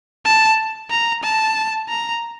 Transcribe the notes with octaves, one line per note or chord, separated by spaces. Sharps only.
A5
A#5
A5
A#5